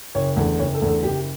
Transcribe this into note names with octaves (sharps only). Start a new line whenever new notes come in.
F#1 C#5
E2 D3 A3
F#1 C#5
A4
E2 D3 A3
A4
F#1 G4